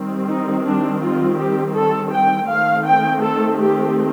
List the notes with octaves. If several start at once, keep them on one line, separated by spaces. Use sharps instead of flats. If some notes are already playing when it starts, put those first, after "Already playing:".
Already playing: D#3 G3 C4
D#4
D4
F4
G4
A4
G5
D#3 A3 C4 F5
G5
A4
G4